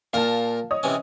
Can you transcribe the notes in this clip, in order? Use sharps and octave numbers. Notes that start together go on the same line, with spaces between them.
A#2 A#4 F5 A5 A#5
C#5 D#5 D#6
C3 E3 C#4